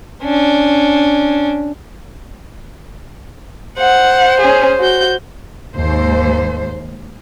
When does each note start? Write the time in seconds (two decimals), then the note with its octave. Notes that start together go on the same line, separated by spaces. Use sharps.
0.23 C#4 D4
3.78 C5 F#5
4.40 C#4 G#4
4.80 F#4 G6
5.76 D#2 G#2 C5